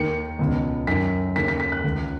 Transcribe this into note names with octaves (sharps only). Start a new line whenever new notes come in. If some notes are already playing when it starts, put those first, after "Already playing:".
Already playing: D#2 D#3 C#7
C#2 B2
F#2 D#3 B6
D#2 C#3 B6
B6
B6
F#6
C#2 C#3